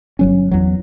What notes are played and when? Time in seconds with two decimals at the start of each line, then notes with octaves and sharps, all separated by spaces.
0.19 G1 F#3 C#4
0.51 E2 F#3